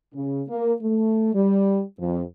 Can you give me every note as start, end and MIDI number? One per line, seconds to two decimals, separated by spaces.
0.14 0.43 49
0.48 0.73 58
0.82 1.32 57
1.34 1.81 55
1.99 2.22 41